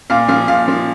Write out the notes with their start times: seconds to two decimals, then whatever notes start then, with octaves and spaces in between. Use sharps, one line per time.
0.10 A#2 F5
0.28 F3 F5
0.48 A#2 F5
0.68 F3